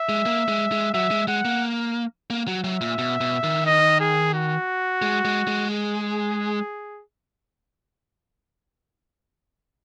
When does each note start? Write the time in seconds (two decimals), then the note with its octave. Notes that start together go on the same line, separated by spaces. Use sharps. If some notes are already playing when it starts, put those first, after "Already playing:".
Already playing: E5
0.09 G#3
0.26 A#3
0.48 G#3
0.72 G#3
0.94 F#3 E5
1.11 G#3
1.28 G#3 F#5
1.45 A#3
2.30 A#3
2.48 F#3
2.64 F#3 E5
2.81 A#2
2.98 B2
3.21 B2
3.43 D#3
3.66 D#5
4.00 G#4
4.34 F#4
5.02 G#3
5.25 G#3
5.48 G#3
5.70 G#4